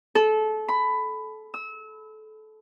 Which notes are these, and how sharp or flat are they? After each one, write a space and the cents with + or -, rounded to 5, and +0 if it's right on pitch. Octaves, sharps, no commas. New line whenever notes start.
A4 -25
B5 +15
E6 -30